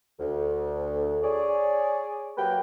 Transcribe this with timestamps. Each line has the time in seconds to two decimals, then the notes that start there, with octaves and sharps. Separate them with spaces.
0.20 D2
1.23 G#4 C#5 D5
2.38 F#3 A#3 F#4 B4 G5